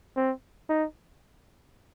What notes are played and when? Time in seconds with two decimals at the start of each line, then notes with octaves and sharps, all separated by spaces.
0.16 C4
0.69 D#4